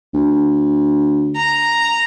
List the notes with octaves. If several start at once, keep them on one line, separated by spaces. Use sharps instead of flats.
D2
A#5